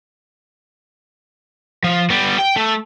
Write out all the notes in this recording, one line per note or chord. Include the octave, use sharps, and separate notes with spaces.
F3
G3 B3
G5
A3